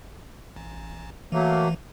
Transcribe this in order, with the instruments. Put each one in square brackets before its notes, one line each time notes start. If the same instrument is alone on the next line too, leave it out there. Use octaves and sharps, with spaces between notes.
[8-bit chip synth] A1
[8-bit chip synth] E3 [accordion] F#3 A3 A#3